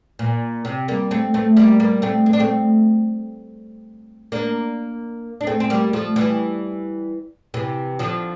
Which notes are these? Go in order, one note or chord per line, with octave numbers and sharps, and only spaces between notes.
A#2
C3
G3 A#3
A3 C4
A3 C4
G3 A#3
G3 A#3
A3 C4
C4
D4
A3 C4
A#3 D4
D4
A3 C4
C4
G3 A#3
F3 A3
E3 G3
C3 E3
D3 F3